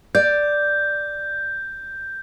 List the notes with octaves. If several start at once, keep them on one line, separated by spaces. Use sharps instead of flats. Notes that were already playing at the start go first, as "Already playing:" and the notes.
D5 G6